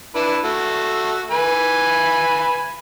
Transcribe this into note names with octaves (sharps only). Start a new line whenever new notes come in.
D4 E4 B4
A3 F#4
B4 G#5 B5